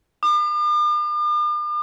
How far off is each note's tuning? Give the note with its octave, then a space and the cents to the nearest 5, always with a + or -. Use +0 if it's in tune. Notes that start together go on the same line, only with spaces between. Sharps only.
D6 +45